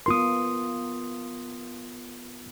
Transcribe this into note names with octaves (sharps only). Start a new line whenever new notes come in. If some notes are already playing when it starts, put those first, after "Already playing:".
B3 F4 A#4 C6 D#6